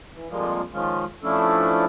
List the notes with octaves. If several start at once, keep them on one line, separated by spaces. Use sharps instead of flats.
E3
F2 F3 G3 G#3 A#3 F4
D#3 F3 G#3 C#4 F4
F3 A3 C#4 D4 E4 A4